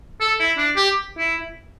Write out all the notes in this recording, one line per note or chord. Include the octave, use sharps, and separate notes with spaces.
A4
E4
D4
G4
E4